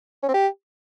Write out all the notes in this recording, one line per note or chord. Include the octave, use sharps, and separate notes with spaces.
C#4
C4
G4